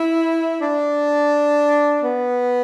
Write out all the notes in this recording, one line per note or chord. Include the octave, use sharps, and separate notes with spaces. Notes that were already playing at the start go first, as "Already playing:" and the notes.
Already playing: E4
D4
B3